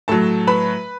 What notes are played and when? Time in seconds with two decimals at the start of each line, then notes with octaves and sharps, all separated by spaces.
0.08 A2 F#3 A4 A5
0.47 B4 B5